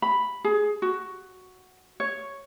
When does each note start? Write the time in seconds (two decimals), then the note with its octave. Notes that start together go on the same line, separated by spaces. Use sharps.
0.02 B5
0.44 G#4
0.82 F#4
2.00 C#5